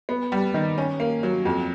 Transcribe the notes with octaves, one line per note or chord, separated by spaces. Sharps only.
B3
G3
D#3
C#4
A#3
F#3
F2